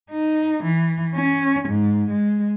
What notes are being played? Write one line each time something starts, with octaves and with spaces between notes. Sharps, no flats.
D#4
E3
C#4
G#2
G#3